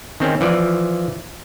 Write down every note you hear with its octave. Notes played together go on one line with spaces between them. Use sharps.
D#3 C4 C#4
E3 F3 D5